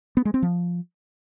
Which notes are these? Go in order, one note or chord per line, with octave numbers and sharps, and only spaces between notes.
B3
G#3
C4
F3